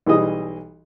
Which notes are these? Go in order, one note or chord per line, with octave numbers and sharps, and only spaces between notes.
B1 E3 G3 G#4 D#5 D#6